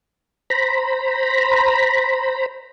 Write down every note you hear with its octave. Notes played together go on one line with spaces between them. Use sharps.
C5 A#5 B5